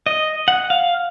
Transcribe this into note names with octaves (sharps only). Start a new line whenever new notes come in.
D#5
F#5
F5